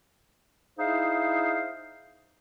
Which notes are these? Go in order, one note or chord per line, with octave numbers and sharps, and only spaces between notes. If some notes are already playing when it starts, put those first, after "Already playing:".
D#4 E4 G#4 C5 E5 F5